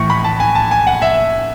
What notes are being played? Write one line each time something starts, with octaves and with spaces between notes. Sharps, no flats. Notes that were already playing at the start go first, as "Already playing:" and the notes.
Already playing: A2 E3 C#6
B5
A5
G#5
A5
G#5
F#5
E5